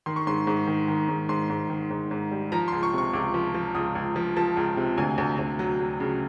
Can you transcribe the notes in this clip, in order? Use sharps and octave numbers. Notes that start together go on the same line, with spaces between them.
D#3 C6
C#6
G#2 C6
G#2
D#3
D#3
G#2
G#2 C6
G#2
D#3
G#2
G#2
G3
F3 A#5
C6
C#2
C#6
C3 C#6
C#2 D6
F3
F3
C#2 D#6
C#2
F3
F3 A5
C#2
C3
D2 G#5
D2
D2
F#3
F#3
C#3